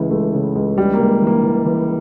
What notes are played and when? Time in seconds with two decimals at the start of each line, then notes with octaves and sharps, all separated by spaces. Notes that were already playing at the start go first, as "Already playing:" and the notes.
Already playing: C#2 C#3 E3 A3
0.11 C#2 A3
0.34 C#3
0.55 C#2
0.77 C#2 G3
0.93 A#3
0.99 C#2
1.22 E3
1.27 A#3
1.43 E3
1.65 E3